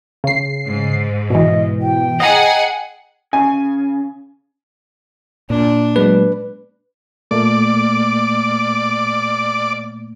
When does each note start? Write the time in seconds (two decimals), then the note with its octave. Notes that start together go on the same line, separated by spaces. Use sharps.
0.24 C#3 C7
0.67 G#2
1.30 B2 E3 D#5
1.82 G5
2.20 G#4 D#5 F#5 G#5 A#5
3.33 C#3 G#5
5.50 A#2 D4
5.96 F#3 G#3 B3 B4
7.31 A#2 A3 A#3 D5